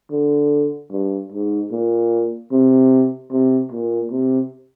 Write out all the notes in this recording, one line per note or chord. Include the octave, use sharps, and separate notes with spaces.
D3
G2
G#2
A#2
C3
C3
A#2
C3